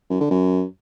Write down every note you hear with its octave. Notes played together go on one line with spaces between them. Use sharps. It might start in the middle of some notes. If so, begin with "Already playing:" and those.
F#2
D3
F#2